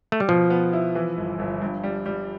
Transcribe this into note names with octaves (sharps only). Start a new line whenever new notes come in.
A3
G3
B2 F3
B3
E4
E3
G1
G1
G2
G3
G3